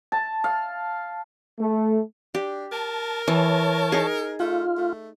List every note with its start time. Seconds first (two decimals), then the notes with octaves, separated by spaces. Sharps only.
0.12 A5
0.44 F5
1.58 A3
2.35 D4 G4
2.72 A#4 A5
3.28 E3 C#5 A5
3.92 D#4 G#4
4.40 A3 F4
4.78 A3